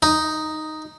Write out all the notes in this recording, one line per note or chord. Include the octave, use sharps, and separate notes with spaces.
D#4